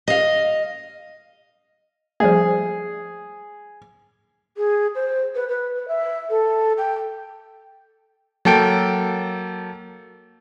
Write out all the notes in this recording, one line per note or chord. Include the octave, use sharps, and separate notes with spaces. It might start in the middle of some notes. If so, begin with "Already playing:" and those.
D#5 F5
F3 G3 A3 G#4
G#4
C5
B4
B4
B4
E5
A4
G5
F#3 A#3 A4 G5 D7